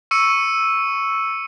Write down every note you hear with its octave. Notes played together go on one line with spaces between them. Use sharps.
C#6 E6 C#7 D#7